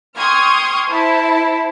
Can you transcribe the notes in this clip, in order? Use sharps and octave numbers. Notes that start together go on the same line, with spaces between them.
G5 C6 C#6 D#6 F6 G#6
E4 C5 A5